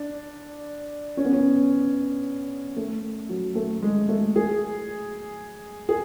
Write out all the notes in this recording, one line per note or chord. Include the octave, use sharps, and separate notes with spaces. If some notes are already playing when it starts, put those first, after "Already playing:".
Already playing: D4
C#4
B3
C#4
A3
F#3
A3
G#3
A3
G#4
G#4